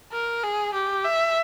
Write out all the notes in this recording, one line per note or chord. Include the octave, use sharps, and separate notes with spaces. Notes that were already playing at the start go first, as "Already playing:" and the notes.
A#4
G#4
G4
E5